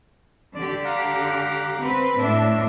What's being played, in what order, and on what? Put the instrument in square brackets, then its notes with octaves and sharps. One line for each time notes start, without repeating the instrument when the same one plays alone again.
[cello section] D3 G4 [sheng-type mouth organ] D5
[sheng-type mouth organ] F5 F#5 A#5
[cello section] C4 B4
[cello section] A2 D4 [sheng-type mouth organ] E5